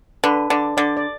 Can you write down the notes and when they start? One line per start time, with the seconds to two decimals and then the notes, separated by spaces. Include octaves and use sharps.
0.24 D3 B4
0.50 D3 D5
0.77 D3 D5
0.97 D5